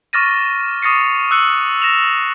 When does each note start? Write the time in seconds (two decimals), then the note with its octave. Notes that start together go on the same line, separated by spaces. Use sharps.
0.13 C#6 D6 F6 A6 A#6 D#7
0.82 C#6 D#6 A6 A#6 C7 C#7
1.31 E6 F#6 C#7
1.82 A#6 E7 F7